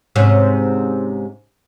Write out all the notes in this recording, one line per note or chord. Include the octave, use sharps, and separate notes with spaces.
G#2 C3 C#4